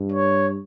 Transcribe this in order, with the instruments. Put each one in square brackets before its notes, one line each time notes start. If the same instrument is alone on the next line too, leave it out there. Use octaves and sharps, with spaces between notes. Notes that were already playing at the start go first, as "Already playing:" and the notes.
Already playing: [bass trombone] G2
[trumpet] C#5